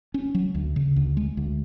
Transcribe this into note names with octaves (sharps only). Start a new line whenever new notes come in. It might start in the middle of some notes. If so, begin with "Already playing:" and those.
C#4
F#3
D2
C#3
D2
G#3
D2